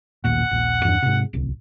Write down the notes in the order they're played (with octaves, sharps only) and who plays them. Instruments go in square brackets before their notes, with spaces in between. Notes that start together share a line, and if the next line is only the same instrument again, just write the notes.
[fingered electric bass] A1 D#2 A#2 [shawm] F#5
[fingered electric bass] D#1 A#1
E2 G2 D4
G#2 C3
D1 C2